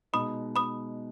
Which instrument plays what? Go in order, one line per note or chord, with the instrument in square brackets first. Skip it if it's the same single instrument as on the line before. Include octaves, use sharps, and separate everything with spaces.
[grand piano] B2 G#3 D#4 [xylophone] B5 D#6
[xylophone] B5 D#6